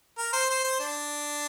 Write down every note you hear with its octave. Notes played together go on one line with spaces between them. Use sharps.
A#4
C5
C5
C5
D4